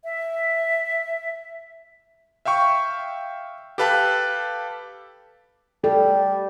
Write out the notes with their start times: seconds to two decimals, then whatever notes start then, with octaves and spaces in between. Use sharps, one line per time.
0.04 E5
2.45 E5 F5 G5 C#6
3.78 G4 A4 B4 F5 A5
5.84 G3 A4